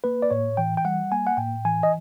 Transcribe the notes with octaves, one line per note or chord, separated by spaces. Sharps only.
A#3 B4
D5
A2 C#5
E3 G5
G5
G3 F#5
A#3 G#5
F#5
A2 G5
E3 G#5
D#5